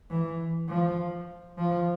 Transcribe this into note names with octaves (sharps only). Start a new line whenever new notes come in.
E3
F3
F3